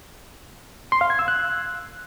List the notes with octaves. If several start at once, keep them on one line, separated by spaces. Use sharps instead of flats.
C6
F5
G#6
E6
F#6